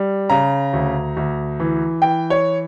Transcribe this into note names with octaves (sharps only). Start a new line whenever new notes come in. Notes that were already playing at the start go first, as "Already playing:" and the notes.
Already playing: G3
C#3 A#5
D2
D2
E3
E3 G5
C#5